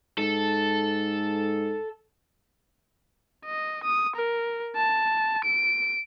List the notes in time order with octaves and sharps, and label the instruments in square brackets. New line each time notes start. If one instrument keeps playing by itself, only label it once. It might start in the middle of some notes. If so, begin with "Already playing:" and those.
[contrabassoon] G#2 [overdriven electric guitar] A4
[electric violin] D#5
D#6
A#4
A5
D7